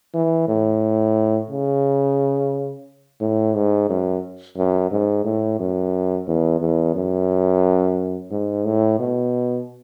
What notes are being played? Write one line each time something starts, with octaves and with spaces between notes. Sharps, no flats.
E3
A2
C#3
A2
G#2
F#2
F#2
G#2
A2
F#2
E2
E2
F#2
G#2
A2
B2